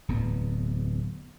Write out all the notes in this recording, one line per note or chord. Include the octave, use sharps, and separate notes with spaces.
D1 E2 B3